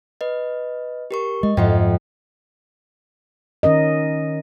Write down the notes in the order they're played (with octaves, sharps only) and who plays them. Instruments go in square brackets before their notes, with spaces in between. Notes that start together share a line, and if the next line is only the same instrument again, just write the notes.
[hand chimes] B4 D#5
G4 A#4 C#6
[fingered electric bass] G#3 [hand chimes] D#5
[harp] F2 [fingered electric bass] G#2 [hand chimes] E5 F#5 G5
[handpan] D#3 C#4 A#4 D#5